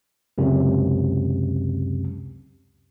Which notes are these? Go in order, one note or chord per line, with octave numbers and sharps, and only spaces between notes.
C#2 F#2 C3